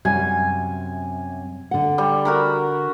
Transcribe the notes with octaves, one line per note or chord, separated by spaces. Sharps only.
F#2 C3 G3 G#5
D3 F#5
G3
F#4 A#4 B5